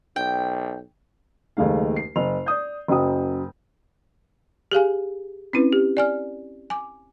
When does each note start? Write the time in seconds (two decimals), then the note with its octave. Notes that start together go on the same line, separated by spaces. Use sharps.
0.16 B1 G5
1.57 F#1 D#2 G#3 A3 F5
1.96 C7
2.16 F#1 F7
2.46 D5 D#6 G6
2.88 F#1 F#2 F#3 G5 D#6
4.72 G4 G#4 F5 G#5
5.53 C4 C#4 E4 B4
5.73 G4
5.97 D5 G#5 F6
6.70 G#5 D6